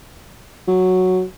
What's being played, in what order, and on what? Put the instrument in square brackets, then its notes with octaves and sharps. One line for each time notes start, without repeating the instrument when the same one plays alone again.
[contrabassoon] F#3